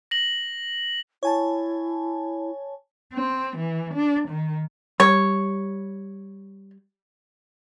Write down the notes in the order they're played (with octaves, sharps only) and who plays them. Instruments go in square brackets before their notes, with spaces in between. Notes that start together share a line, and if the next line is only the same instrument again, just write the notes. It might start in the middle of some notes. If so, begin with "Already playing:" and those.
[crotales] A#6 F#7
[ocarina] E4 [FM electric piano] C#5 G#5 A5
[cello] C4
E3
D4
D#3
[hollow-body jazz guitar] G3 [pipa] C#5